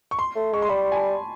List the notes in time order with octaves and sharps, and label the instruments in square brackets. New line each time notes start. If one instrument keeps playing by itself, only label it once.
[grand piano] C#6
C6
[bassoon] A3
[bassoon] G#3 [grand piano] C#6
[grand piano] C6
[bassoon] G3 [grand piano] B5
[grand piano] G#5
A5